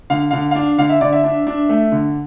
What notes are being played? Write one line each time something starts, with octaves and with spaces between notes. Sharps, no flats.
D3 F5
D3 F5
D4 F5
D3 F5
E5
D3 D5
E5
D4
D4
A3
D3